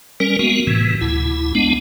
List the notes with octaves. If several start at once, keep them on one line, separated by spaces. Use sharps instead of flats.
G3 C#4 A#4
G#3 A#3 B3 F#4
A2 C3 E3
D2 E4
G#3 B3 D4